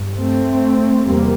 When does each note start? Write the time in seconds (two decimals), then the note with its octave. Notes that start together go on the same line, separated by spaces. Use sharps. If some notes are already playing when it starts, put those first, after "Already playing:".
Already playing: G2
0.18 A3 C4
1.04 E2 C3 G3 A#3